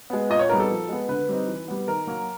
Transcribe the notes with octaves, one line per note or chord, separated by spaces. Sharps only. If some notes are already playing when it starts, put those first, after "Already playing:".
G#3 B3
A#2 D#5
C#5
G3 B3 D#4 A#4
A4
F3
G#3 B3
D3 B4
G3 C4 D#4
E3
G3 B3
D#3 A#4
F#3 A#3